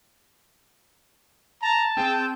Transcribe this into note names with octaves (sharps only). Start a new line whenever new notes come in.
A5 A#5
C4 G#4 G5 D#7